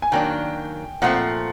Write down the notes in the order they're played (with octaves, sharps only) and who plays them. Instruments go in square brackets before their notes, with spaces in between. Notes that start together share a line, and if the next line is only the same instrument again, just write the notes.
[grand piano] G#5
[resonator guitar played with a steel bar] D#3 F#3 A#3 D4 [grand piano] G5
[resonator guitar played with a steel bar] A#2 F3 A3 C4 [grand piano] F#5